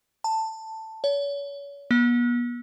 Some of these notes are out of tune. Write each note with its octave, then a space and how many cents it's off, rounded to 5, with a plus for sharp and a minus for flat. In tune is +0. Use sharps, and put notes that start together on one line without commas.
A5 +10
C#5 +35
B3 -40